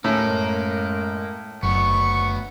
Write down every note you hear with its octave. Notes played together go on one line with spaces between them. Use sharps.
D#2 A2 A#3 C#4
F#2 G#3
F#1 D2 B3 C#6